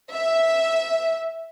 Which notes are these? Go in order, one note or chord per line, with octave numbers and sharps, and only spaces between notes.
E5